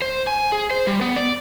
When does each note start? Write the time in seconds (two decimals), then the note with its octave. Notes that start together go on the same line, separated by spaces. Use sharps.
0.02 C5
0.27 G#5
0.52 G#4
0.71 C5
0.87 G3
1.01 B3
1.16 D5